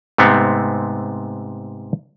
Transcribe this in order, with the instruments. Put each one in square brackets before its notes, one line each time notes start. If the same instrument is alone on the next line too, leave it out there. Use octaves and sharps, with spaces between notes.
[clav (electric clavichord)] G#2 C3 A3 B3 C4